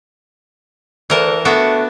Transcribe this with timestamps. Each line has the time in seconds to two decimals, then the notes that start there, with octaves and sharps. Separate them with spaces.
1.10 D2 E3 A#4 A5
1.45 A3 B3 D4 F#4